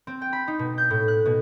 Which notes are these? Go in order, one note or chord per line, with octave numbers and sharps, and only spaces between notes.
C4
G5
B5
D#4
B2
G6
A2
F#6
B2